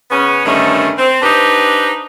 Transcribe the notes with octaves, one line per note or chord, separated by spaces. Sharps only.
C#3 B3 C#4
G2 D3 D#3 A3 C#4
C4
D4 D#4 G4 B4 C5